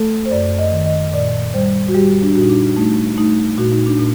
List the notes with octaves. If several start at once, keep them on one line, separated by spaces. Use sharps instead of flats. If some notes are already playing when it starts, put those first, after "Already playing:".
Already playing: A3 A4
C5
F#2 D5
D#5
D#3
D#5
A#2 D5
G3 C5
F#4
G3 G4
D4
A#2 F#4
D#4
D4
A3 D#4
A3 D#4
A#2 F#4
D#4
D4
A#2